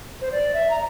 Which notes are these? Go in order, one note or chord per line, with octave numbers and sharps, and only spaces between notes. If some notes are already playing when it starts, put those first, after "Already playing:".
C5
D5
E5
A#5